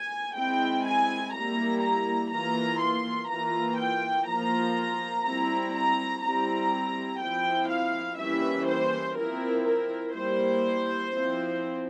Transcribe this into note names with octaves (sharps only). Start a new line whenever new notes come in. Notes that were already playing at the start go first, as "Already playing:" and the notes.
Already playing: G#5
G#3 C4 E4 G5
G#5
G3 A#3 E4 A#5
A#5
E3 A#3 F4 A#5
C6
E3 A#3 F4 A#5
G5
F3 A#3 F4 A#5
G3 C4 E4 A#5
A#5
G3 C4 E4 A#5
F3 C4 E4 G5
F5
E3 G3 A#3 C#4 E4 E5
C5
F3 C4 E4 A#4
A#4
G3 A#3 E4 C5
F3 C4 E4